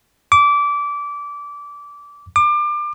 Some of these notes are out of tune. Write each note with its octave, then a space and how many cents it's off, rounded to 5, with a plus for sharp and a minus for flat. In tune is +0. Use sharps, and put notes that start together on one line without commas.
D6 -20
D6 +30